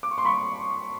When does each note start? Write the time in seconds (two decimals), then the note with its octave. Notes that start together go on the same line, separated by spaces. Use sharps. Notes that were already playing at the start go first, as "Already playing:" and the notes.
0.03 D6
0.11 C#6
0.18 C6
0.25 B5 C#6